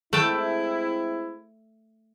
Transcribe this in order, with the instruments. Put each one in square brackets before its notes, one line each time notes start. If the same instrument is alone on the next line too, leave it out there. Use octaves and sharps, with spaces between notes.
[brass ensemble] G#3 C4 E4 [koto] A3 G5 A5